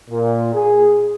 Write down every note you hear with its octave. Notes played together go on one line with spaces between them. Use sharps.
A#2
G#4